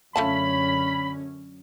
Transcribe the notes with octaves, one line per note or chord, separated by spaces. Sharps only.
F#2 D3 A3 C#4 F4 A5 B5